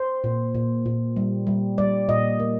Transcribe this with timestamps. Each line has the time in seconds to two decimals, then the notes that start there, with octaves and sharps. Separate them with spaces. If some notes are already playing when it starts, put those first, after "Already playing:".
Already playing: C5
0.24 A#2
0.55 A#2
0.86 A#2
1.16 G3
1.47 G3
1.78 G3 D5
2.09 A#2 D#5
2.40 A#3